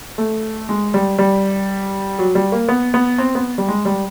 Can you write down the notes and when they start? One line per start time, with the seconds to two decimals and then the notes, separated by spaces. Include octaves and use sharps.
0.18 A3
0.69 G#3
0.94 G3
1.19 G3
2.19 F#3
2.35 G3
2.52 A#3
2.69 B3
2.94 B3
3.18 C4
3.35 B3
3.58 G3
3.68 G#3
3.85 G3